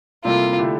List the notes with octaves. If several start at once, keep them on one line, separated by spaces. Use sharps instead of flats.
C3 G3 A#3 E4 F4 A4
D3 A3 E4 G4